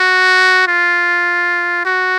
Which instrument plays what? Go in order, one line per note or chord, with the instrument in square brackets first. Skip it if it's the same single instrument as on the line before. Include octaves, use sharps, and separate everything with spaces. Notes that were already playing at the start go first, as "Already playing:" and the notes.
Already playing: [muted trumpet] F#4
F4
F#4